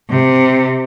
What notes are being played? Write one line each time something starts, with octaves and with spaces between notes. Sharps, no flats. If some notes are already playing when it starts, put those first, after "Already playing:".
C3